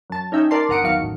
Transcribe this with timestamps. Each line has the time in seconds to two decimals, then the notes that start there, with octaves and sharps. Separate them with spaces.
0.10 F#2 A5
0.32 C#4 D#4 E5 G5
0.51 A#4 D5 A5 C6
0.69 G1 A#4 F#5 D#6 C#7 D7
0.83 E2 D#3 F#3 F5 C#7
1.01 A1